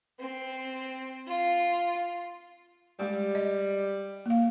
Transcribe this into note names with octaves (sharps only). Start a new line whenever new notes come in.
C4
F4
G3 G#3 G4
D#5
A#3 F5